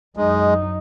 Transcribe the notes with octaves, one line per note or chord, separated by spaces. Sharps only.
F#2 G#3 D#4